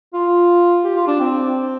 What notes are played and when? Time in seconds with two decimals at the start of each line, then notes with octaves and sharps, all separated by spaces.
0.14 F4
0.84 G4
0.96 F4
1.07 D4
1.20 C4